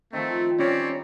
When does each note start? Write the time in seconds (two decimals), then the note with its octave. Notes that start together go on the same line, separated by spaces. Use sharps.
0.13 D#3 F3 A3 C4
0.59 G3 C4 C#4 C#5 D5